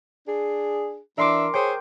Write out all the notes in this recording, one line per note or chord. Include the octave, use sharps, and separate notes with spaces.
D4 G#4
E3 D4 A#4 E5 C6 D6
G#4 C5 C#5 G5